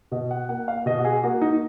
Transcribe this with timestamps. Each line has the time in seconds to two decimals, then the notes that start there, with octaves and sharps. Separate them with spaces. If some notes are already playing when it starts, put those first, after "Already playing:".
0.12 B2 D#5
0.31 F#5
0.49 A#3 F#5
0.68 F5
0.86 B2 D#5
0.99 F#4
1.05 G#4
1.24 A#3 F#4
1.41 D#4